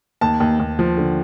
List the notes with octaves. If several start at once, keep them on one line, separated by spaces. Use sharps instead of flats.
D#2 A5
D#2
D#2
F3
D3